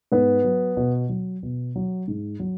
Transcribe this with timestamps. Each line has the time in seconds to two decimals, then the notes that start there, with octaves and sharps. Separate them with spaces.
0.12 G#2 B3 B4
0.44 F#3
0.77 B2
1.09 F#3
1.43 B2
1.75 F#3
2.08 G#2
2.40 F#3